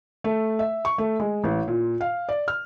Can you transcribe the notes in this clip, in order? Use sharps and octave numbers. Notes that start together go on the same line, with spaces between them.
A3
E5
C#6
A3
G#3
A1
A#2
F5
D5
F6